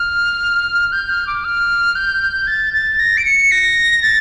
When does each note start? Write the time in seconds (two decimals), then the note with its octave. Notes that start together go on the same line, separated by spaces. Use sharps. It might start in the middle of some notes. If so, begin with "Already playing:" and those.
Already playing: F6
0.92 G6
1.10 F6
1.27 D6
1.44 F6
1.96 G6
2.47 A6
2.74 A6
2.99 A#6
3.17 D7
3.25 C#7
3.51 A#6
4.03 A6